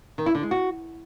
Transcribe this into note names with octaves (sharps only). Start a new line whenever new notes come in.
D#3
E4
D3
G#3
F#4